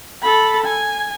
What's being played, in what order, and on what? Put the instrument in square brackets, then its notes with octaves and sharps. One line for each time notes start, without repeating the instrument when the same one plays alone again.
[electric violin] A4 B5
G#5